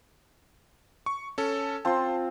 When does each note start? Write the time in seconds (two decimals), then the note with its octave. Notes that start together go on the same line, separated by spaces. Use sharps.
1.06 C#6
1.38 C#4 A4
1.85 C4 F4 A5 C6